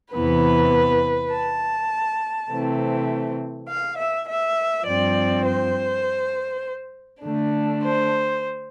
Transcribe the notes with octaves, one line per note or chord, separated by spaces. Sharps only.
E2 C3 E3 B3 B4
A5
C3 E3 A3 C4
F5
E5
E5
G2 F3 C4 D5
C5
D3 A3 D4
C5